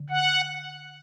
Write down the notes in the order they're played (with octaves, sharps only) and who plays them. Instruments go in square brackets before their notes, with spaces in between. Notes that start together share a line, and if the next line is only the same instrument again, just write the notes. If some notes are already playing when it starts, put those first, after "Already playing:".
Already playing: [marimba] D3
[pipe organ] F#5